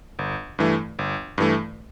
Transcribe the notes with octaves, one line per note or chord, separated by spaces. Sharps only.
G1
G2 E3 A3
G1
G2 E3 A3